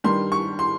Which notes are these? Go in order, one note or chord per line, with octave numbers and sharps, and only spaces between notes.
G2 D#3 G3 C6
C#6
C6